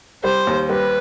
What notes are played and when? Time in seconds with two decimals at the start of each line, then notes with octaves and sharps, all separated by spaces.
0.24 G3 C5
0.47 D#2
0.69 G3 B4